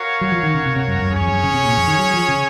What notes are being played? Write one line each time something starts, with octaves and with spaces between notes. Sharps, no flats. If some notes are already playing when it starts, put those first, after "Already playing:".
Already playing: F#4 A#4 C#5 F5
F#3
F3
D#3
C#3
C3
C3
F#2
F#2
F#2 C#4 G#4 C#5
F2
F#2
C#3
C3
A#2
F2
D#3
F#3
F3
C#3